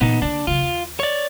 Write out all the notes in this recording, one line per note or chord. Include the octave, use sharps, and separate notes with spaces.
A#2 E3 B3 D#4
D3 A#3 D4
C#3 F#3 F4
D#2
C#5 D5